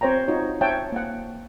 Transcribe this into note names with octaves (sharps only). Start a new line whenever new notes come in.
C4 C5 C#5 G5 A#5
D#4 F4 F#4 C#5
C5 C#5 E5 F#5 G5 A5
A#3 F#5